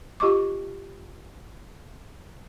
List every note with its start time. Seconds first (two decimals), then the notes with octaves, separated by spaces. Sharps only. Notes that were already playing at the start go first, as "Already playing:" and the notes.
0.20 F4 G4 D#5 C#6 D6